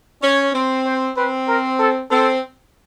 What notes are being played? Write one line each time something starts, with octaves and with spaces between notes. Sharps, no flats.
C#4 C#5
C4
C5
C4 B4
A#4
A4
C4 A4